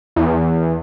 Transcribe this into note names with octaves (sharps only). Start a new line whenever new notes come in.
E2